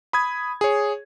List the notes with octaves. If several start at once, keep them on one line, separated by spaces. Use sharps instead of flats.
B5 D#6 G#6
G#4 C#5